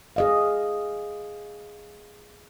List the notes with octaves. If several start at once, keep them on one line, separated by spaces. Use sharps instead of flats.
G#4 D#5 F5